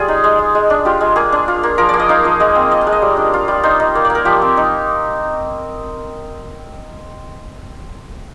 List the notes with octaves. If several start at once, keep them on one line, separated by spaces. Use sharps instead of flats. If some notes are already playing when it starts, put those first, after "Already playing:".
Already playing: G3 F4 G#4
D#4
G#3
G#3
G#3
D4
F4 G4
G#3
A#3 G#4
D4
F4
A#3
F3 A#4
A#3 D5
D#5
D#4 F5
F3 D#5
G#3 D#5
C4
F4 D#5
F5
G#3
D#5
G3
D4
F4
G3
D#4 C5
D#4
A#3
D5
A#3
A#4
F3 G4
C4
D#4